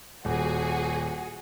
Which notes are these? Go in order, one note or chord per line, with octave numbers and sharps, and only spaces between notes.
D#1 F#4 G#4